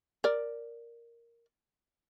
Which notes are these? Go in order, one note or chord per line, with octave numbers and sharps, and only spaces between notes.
A#4 D5